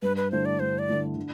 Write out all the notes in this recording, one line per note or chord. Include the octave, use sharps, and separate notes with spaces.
G2 B4
B4
D3 A3 E4 C5
D5
G2 C5
D5
D3 A3 E4
D3